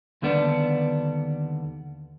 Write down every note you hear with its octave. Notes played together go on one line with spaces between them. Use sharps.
D#2 D3 G3 B3 D4